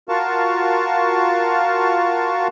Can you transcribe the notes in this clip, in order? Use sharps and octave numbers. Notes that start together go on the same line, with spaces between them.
F4 F#4 A#4 F5 A5 C#6